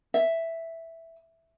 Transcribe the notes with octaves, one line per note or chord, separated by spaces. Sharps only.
E5